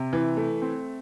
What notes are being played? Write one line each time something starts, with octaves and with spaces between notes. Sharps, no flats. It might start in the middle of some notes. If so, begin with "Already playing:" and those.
Already playing: C3
E3
A3
C4